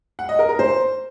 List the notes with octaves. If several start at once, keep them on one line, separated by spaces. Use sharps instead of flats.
F#5
D#5
A#4
A#4
C5